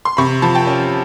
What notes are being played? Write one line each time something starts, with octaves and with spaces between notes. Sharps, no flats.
C6
C3 B5 C#6
F3 A5 B5
G5 A5
C#4